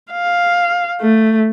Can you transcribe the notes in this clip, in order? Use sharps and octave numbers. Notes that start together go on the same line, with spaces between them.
F5
A3